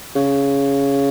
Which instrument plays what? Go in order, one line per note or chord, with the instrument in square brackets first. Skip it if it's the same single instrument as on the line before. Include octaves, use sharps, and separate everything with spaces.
[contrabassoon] C#3